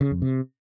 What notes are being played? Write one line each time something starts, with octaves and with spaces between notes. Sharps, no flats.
C#3
F2
C3